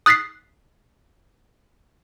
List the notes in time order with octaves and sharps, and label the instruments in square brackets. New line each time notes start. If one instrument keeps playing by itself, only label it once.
[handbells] D#6 F#6 A6 B6 C7